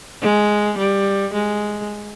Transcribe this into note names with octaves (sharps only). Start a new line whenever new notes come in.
G#3
G3
G#3